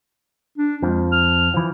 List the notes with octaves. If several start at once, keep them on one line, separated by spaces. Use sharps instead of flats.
D4
F2 F3 G#3
F6
E3 F3